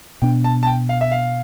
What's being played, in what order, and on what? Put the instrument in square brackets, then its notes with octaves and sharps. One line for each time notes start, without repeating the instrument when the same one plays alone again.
[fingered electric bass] B2 B3 D4 [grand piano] G5
[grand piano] A5
A5
G5
F5
E5
F5